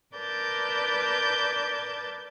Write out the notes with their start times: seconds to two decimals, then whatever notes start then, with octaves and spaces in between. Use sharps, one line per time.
0.15 A#4 B4 D5 A5 G6 A6